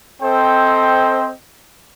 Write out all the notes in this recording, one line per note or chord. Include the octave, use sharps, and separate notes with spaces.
C4 A4 C5 D#5 G5